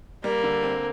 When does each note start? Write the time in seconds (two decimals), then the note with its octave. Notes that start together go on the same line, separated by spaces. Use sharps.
0.24 G3 A#3
0.43 D3
0.63 C4